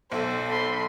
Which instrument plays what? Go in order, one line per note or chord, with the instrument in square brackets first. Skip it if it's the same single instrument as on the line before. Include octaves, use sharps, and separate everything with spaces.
[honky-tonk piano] B1 [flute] A4 [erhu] C5
[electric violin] B5 C6